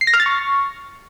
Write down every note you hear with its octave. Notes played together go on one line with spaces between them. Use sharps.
C7
A#6
F6
A6
C#6